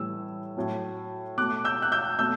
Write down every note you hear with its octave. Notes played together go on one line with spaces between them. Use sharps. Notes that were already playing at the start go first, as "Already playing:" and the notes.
Already playing: A2 E3 G3 E6
A2 F#3 A3
B2 A3 D6 F#6
E6 G6
F#6
E6 G6
B2 A3 E6 G6